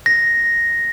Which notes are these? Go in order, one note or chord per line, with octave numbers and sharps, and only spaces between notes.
A#6